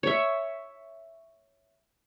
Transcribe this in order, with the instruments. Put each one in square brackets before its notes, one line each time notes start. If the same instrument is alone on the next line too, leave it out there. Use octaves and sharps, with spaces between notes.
[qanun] C#5 E5